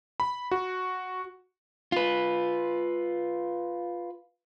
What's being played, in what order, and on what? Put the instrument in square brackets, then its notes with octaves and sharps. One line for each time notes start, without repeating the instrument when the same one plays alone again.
[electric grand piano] B5
F#4
[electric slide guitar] F4 B4